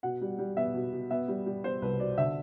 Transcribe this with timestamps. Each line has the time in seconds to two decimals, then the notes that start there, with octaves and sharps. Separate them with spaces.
0.03 B2 F#5
0.21 G3
0.38 G3
0.57 B3 E5
0.75 B2
0.93 B2
1.10 B3 E5
1.28 G3
1.46 G3
1.64 B3 C5
1.82 C2 B4
2.00 B2 D5
2.18 D3 E5